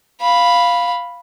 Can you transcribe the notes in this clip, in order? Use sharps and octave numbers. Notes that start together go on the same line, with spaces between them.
F5 B5